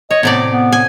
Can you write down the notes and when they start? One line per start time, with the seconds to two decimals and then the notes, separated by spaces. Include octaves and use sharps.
0.11 C#5 D#5
0.23 A2 C3 B3 D5
0.51 B3
0.72 G#5